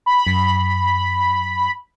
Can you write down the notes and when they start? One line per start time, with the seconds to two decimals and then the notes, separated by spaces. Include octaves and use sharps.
0.06 B5
0.27 F#2